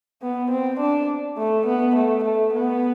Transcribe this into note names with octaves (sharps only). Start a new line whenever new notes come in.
B3
C4
D4
A3
B3
A3
A3
B3